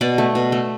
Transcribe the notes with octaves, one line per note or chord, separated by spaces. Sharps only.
B2 D5
A3
B2
A3